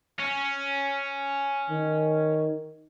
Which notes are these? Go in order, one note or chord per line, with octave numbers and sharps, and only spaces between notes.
C#4
D#3